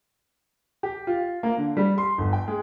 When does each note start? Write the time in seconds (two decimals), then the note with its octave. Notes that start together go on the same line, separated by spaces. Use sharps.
0.83 G4
1.07 F4
1.43 A#3
1.57 D3
1.77 G3
1.98 C6
2.18 G1
2.33 G5
2.48 G#3